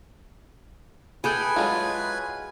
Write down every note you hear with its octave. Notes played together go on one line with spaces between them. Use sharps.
E4 G#4 A4 B4 G5 G#5
F#3 G#3 F4